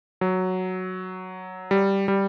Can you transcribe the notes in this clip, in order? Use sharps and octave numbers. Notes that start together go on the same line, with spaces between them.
F#3
G3
G3